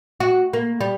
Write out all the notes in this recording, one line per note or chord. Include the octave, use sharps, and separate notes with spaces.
F#4
A#3
G3